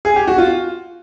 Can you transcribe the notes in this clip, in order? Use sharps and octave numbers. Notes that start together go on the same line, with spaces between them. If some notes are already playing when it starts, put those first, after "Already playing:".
G#4
G4
F#4
F4